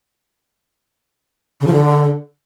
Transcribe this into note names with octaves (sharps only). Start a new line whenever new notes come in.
C#3
F3
D3